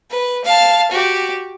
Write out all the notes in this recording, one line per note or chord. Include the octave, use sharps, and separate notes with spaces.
B4
F5 A5
F#4 G4